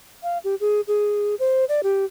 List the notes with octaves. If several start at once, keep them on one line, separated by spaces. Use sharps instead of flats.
F5
G4
G#4
G#4
C5
D5
G4